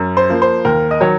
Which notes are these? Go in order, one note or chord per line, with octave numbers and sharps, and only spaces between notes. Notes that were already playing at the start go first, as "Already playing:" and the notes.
Already playing: F#2
C5
F3 A#3
C5
D#2 A#4
D#5
D#3 F#3 C#5